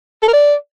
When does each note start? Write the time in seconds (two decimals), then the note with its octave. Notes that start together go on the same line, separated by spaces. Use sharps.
0.22 A4
0.28 A#4
0.33 D5